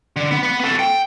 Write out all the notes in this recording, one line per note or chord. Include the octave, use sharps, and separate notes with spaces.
D3
B3
B4 F#5
B3 A4
G5